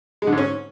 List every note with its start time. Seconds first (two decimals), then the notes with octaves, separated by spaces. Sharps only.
0.22 G#3
0.27 D3
0.32 G#2
0.38 C#4